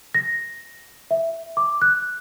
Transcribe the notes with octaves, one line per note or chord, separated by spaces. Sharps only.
A#6
E5
D6
F#6